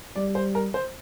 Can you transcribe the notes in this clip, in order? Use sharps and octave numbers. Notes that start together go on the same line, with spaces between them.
G3 D5
C5
A#4
C5